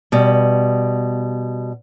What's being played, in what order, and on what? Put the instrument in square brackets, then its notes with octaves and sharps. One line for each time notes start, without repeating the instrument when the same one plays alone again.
[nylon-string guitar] B2 G3